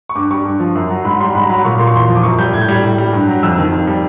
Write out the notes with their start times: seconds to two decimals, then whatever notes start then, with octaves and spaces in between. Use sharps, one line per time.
0.09 C#6
0.15 G2 D6
0.31 G3 C#6
0.45 G2
0.60 F3
0.75 F#2
0.90 F#3
1.05 G#2 B5
1.20 G3 C6
1.35 G#2 B5
1.42 A#5
1.50 F#3 B5
1.65 A#2 C#6
1.79 A#2 C6
1.87 C#6
1.95 E2 C6
2.09 F3
2.15 D6
2.23 F#2 C#6
2.39 G3 G6
2.53 A2 G#6
2.61 G6
2.68 G3 G#6
2.84 A2
2.98 G3
3.13 G2
3.28 F#3
3.43 F2 E6
3.58 D#3
3.72 F2
3.87 G3